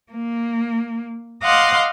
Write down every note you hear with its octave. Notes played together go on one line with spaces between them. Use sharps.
A#3
D#5 F5 F#5 C6 D6